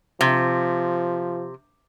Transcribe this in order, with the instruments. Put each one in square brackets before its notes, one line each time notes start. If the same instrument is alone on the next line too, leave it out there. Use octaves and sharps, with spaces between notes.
[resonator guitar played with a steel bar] C3 [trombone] F3